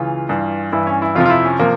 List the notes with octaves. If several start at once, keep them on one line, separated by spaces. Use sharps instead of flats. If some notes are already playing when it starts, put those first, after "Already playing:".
Already playing: C#2 C#3 E3 F4
G2 E3
G2 E3 E4
C#4
E4
F2 C3 F3 F4
F4
E4
C#4
C3 F3 A#3